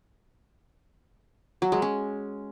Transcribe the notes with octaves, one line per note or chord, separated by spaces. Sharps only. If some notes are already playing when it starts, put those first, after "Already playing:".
F#3
G#3
C#4